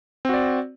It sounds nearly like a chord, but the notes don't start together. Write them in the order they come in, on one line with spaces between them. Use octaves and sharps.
C4 F#4 D5